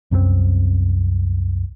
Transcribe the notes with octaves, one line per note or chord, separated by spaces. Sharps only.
C2 F#2 F#3 C4